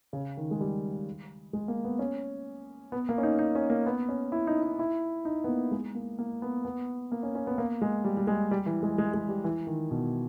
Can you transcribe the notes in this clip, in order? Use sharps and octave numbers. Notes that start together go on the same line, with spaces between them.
C#3
D#3
G#3
G3
G#3
A#3
B3
C#4
B3
A#3
C#4
D#4
D#4
C#4
A#3
B3
C#4
E4
D#4
D#4
E4
D#4
B3
A#3
G#3
A#3
A#3
B3
B3
A#3
C#4
C#4
B3
A#3
G#3
G3
G3
G#3
G3
E3
G#3
G#3
G#3
G3
E3
D#3
B2